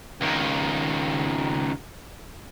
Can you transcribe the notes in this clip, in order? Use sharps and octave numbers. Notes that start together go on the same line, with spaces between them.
C#2 D#3